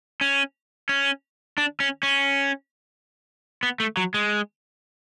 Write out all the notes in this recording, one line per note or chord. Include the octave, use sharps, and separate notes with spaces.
C#4
C#4
D4
C#4
C#4
B3
A3
F#3
G#3